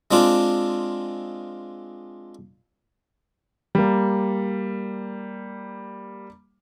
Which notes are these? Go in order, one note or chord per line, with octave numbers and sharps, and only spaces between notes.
G#3 C4 D4 F4
G3 A#3